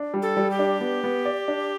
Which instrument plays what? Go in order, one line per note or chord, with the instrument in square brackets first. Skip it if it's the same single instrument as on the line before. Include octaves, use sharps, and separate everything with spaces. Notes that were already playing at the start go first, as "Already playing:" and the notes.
Already playing: [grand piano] D4
G3
[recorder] A4
[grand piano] G3
[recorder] G4
[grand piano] D4
B3
B3
D5
D4